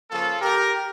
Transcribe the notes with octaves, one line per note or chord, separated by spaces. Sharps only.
C#3 F3 A#3 F4 A4
G4 A#4